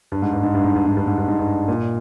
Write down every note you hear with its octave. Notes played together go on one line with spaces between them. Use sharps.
G2
G#2
G2
G#2
G2
G#2
G2
G#2
G2
G#2
G2
G#2
G2
A#2